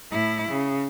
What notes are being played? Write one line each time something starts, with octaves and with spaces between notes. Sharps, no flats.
A2 E4
C#3